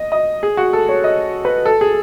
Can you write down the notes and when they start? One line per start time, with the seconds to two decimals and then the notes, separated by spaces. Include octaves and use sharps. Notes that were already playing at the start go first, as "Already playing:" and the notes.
Already playing: D#5
0.12 D#5
0.43 G#4
0.57 F#4
0.73 A4
0.89 C#5
1.04 D#5
1.45 B4
1.66 A4
1.81 G#4